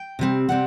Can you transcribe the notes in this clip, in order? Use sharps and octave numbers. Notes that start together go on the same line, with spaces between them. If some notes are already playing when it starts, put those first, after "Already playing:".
Already playing: G5
C3 G3 C4
C3 G3 C4 F#5